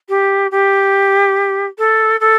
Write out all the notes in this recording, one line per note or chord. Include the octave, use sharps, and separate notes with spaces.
G4
G4
A4
A4